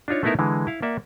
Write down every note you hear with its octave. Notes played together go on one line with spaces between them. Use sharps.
D4 D#4 F4 C#5
A3 B3 D#4 E4 A#4 E5
D3 E3 G#3
E4 F5
A#3 D5 E5 F#5